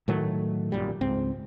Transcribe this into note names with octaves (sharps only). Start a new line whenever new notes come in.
A2 D#3 F#3 A3
G#1 F#2 A#2 G3
C#2 G#2 C4